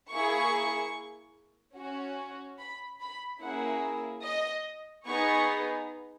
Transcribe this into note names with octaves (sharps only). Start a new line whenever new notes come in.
A#3 E4 G#4 C#6
C#4 F#4
B5
B5
A#3 C#4 E4 G#4 F#5
D#5
B3 D#4 G#4 C#6